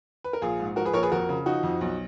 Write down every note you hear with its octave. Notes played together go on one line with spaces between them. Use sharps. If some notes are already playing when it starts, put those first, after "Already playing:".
B4
A#4
A#1 F4 G#4
G#2
F3 F#4 A#4
G#4 B4
A#1 A#4 C#5
G#4 B4
F2 F#4 A#4
C#3
F3 D#4 F#4
F2
B1